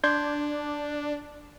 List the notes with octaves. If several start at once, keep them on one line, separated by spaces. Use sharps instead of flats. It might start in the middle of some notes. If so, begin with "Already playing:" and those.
D4 C6 G6 G#6